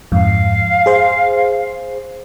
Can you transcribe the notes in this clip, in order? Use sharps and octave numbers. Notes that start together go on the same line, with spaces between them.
F2 G#2 F5
G#4 C5